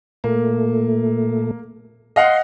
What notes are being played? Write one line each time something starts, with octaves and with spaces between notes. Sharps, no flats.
A#2 A3 A#3
D#5 F5 F#5 C6